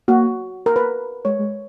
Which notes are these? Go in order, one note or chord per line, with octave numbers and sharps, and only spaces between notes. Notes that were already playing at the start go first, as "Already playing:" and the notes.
A#3 F#4
A#3 A#4
B4
G#3 C#5
G#3